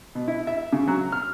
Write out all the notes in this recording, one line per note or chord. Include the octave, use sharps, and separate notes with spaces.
B2
E4
E5
C#3
F#3
F6